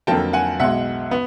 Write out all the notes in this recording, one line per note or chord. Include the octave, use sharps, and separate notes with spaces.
F2 D3 F#3 A#3 G5 A5
F#5 G#5
B1 B2 G#3 E5 F#5
B3